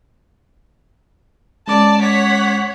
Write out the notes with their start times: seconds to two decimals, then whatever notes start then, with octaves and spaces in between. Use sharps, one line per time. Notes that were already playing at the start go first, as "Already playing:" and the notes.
1.68 G#3 C#4 D5 A5 D6
2.02 C#5 F#5 B6